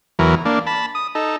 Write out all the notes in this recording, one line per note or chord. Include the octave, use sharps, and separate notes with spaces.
E2 E3 F#3 A#4
A#3 D4
A5 B5
D#6
D#4 A4